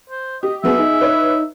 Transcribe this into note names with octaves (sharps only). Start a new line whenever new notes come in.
C5
G4 D#5
F#3 B3 G#4 E5
D#4 G#4
B4 C#5